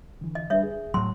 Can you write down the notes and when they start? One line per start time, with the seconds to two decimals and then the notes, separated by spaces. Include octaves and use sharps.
0.21 D3 E3
0.35 D#5
0.50 G3 D4 B4 C#5 E5
0.63 G#4
0.94 A2 F#3 C6